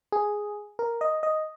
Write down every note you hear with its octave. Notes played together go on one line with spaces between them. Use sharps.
G#4
A#4
D#5
D#5